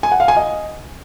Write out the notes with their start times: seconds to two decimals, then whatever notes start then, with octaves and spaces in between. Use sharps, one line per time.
0.03 G#5
0.12 F#5
0.20 F5
0.28 G#5
0.37 D#5